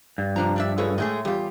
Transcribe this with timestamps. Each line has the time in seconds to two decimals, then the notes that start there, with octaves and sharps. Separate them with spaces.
0.18 G2
0.36 C3 F3 D4 A#5
0.56 G3 D4 E5
0.78 F#2 F4 G#4 A4 B4 C#5
0.98 A2 G#3 A3 G#4
1.25 E2 G3 F4 G4